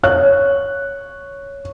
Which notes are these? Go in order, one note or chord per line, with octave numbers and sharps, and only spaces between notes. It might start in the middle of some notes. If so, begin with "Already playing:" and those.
C#5 F#6